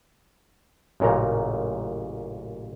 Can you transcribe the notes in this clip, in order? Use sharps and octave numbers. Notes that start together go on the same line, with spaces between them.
A1 F#2 A#2 C#3 A#5